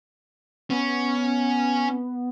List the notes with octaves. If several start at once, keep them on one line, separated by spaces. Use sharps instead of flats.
B3 C#4